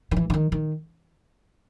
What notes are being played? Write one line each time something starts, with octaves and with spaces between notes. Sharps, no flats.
D#3
E3
D3
D#3
D#3